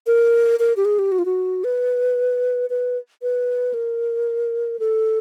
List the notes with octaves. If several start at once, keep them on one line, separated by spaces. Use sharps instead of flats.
A#4
A#4
G4
G#4
G4
F#4
F4
F#4
B4
B4
B4
A#4
A4